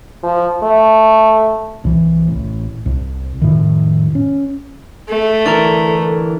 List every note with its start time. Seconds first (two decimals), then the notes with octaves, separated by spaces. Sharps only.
0.23 F3
0.63 A3
1.84 C2 E3
2.28 A1
2.86 C2
3.42 F1 A2 D#3
4.15 C#4
5.09 A3
5.46 D3 E3 A4 A#4